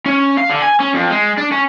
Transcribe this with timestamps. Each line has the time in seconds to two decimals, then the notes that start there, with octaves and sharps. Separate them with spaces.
0.06 C#4
0.38 F5
0.50 D3
0.63 G#5
0.80 C#4
0.94 F2
1.10 G#3
1.38 D4
1.52 C#4